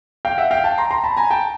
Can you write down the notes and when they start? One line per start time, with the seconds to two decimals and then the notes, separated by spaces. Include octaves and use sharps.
0.25 F5 G5
0.38 E5 F#5
0.51 F5 G5
0.64 G5 A5
0.78 A#5 C6
0.91 A#5 C6
1.04 A5 B5
1.17 G#5 A#5
1.30 G5 A5